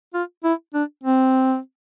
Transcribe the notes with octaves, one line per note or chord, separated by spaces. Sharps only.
F4
E4
D4
C4